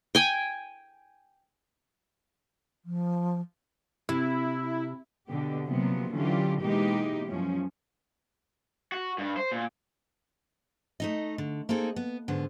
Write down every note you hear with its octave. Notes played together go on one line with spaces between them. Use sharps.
G5 G#5
F3
C3 E4
B2 D3 G4
C3 F3 F#3 A#3 B3
D3 E3 F#3 C#4 F4 G4
B2 E3 G#3 A#3 D#4 G4
F#2 F3 C#4
F#4
G2
C5
A#2
A3 D#4 D#5
D3
A#3 C4 D#4 G#4 A4
B3
D#2 G#2 D3 B3